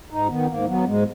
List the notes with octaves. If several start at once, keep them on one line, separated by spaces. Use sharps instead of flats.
G#2 D#4
D#3 B3
G#2 A#3
F#3 B3
G#2 G#3